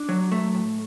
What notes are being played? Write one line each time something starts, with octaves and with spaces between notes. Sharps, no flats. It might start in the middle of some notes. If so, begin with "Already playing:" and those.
Already playing: D4
F#3
A3
A2